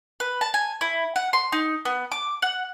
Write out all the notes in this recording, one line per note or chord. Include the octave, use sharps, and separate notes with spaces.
B4
A5
G#5
E4
F#5
C6
D#4
B3
D6
F#5